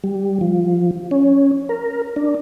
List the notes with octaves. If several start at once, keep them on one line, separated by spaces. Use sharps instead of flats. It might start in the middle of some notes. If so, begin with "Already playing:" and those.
G3
F3
C#4
A#4
D4